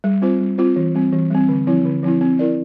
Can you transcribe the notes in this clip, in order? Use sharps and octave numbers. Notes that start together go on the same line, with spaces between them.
G3
C4 F4 C5
G3
C4 F4 C5
E3
G3 C4
E3
G3 C4
D3
F3 C4 E4
D3
F3 C4 E4
C4
E4 A#4 D5